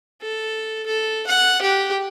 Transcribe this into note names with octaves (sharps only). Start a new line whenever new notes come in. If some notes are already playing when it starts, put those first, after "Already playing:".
A4
A4
F#5
G4